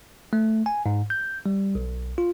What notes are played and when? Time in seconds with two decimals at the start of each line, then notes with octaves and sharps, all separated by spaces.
0.33 A3
0.66 G#5
0.86 G#2
1.10 G6
1.46 G3
1.75 B1
2.18 F4